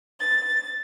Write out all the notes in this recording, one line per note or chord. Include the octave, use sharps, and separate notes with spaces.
A6